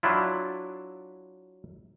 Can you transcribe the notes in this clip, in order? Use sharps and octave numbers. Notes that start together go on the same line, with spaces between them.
F#3 D4 E4 F4